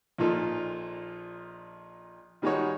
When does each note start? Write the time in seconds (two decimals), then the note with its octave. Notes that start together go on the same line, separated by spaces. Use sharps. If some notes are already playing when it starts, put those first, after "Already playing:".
0.18 A#1 A#2 D#4 F4 A4
2.42 D#3 G3 G#3 D#4 F#4 C#5